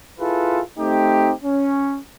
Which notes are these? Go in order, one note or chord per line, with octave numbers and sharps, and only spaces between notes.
E4 F4 G#4 A4 B4
A3 C4 D#4 G4
C#4